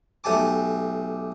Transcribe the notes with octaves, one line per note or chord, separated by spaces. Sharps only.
B1 A3 G4 G#5 A5 D6